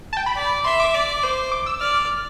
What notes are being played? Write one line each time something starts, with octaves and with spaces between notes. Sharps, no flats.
A5
G5
B5
D5
E5 C6
D6
D5
C5
D6
E6
D5 F6